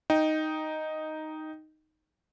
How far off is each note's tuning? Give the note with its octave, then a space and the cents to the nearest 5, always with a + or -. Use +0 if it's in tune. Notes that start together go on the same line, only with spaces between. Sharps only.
D#4 +0 G5 +0